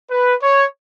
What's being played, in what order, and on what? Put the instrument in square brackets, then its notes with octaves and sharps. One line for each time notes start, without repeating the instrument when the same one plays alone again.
[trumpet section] B4
C#5